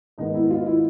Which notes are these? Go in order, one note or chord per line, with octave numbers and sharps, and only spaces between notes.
G#2 D#3 G#3 B3 D#4
E4
F4
E4